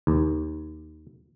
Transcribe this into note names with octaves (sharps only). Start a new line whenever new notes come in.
D#2